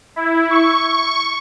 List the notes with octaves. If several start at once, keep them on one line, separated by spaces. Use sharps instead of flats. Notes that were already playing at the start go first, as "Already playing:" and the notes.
E4
C#6
C#6